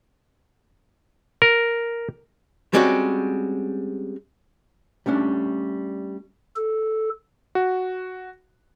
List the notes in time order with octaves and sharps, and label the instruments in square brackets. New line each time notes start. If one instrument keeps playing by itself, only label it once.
[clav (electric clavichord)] A#4
[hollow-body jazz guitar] G3 G#3 C4 C#4 F#4
G3 A3 C#4 D4
[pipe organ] A4
[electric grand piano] F#4